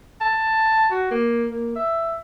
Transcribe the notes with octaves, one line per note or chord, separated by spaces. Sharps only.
A5
F#4
A#3
A#3
E5